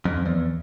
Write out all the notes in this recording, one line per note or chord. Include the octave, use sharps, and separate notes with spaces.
F2
E2